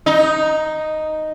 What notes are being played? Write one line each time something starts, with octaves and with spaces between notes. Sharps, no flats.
D#4